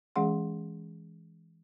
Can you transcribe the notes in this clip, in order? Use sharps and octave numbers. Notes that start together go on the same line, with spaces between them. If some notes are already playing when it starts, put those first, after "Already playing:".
E3 G#3 C#4 G#4 F#5 C6